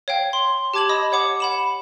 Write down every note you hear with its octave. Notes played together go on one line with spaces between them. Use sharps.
C#5 F5 G5
C6
G4 A5 D6 G#6 E7 F#7
D#5 B5 D#6
C#5 F#5 D6 D#6
F#5 B5 E7